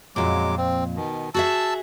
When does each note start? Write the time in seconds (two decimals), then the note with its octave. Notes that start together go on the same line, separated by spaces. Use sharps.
0.16 F2 A#2 F#3 G#3 D6
0.58 C4
0.96 B2 D#3
1.34 F#4 G#4 E5 A5 E6